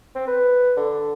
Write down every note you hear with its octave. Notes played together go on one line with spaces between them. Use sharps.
C4
B4
D3